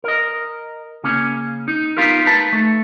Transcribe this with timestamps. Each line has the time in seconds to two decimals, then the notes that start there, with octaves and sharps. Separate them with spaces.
0.04 A#4 D#5
1.04 C#3 A#3 C#4
1.68 D#4
1.97 B3 D#4 F4 G4 A#4
2.25 D#4 B4 A5
2.53 A3 A4